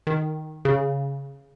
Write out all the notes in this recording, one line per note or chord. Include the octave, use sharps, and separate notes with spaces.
D#3
C#3